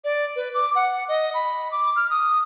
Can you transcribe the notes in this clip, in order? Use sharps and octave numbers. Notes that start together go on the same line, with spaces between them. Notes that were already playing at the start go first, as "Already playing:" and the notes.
D5
B4
D6
F#5
D#5
B5
D6
F6
D#6